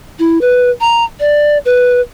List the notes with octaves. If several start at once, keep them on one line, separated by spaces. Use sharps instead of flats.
E4
B4
A#5
D5
B4